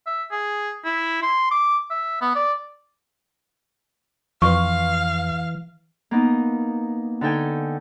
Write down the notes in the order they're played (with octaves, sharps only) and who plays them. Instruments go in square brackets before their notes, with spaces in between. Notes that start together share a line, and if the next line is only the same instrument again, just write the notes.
[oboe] E5
G#4
E4
C6
D6
E5
B3
D5
[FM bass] F2 [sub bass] E3 [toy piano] B4 C6 C#6 [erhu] F5
[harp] A#3 B3 D#4
D3 D#4 A4 G5 G#5